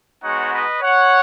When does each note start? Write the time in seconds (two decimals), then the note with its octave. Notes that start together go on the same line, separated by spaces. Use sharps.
0.23 G#3 B3 D#4 F#4 C#5 F#5
0.52 B4 D#5
0.82 C#5 F#5